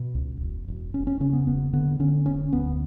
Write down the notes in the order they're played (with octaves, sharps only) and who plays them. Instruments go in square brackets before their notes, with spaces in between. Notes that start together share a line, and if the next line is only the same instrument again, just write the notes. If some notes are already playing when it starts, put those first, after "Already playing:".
Already playing: [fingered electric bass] B2
C#2
E1
E1
E1 C#4
C#4
C#3 C#4
B3
E1 B3
D3 B3
D3 C#4
E1 C#4
D2 B3